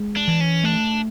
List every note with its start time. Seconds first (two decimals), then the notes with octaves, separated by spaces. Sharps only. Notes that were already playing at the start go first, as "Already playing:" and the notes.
Already playing: G#3
0.16 D4
0.28 E3
0.40 C#4
0.64 A3 D4